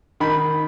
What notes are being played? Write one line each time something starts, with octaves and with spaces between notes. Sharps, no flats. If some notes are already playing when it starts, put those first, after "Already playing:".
D#3 B5